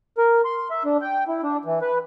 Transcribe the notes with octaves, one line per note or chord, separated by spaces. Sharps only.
A#4
C6
E5
D4
G5
E4
D4
E3
B4